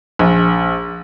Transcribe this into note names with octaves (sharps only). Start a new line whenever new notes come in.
A#1